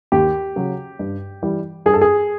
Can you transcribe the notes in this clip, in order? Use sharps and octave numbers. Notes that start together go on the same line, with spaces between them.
D#2 G4
C#3 F#3
G2
E3 G3
G2 G#4
A4
G#4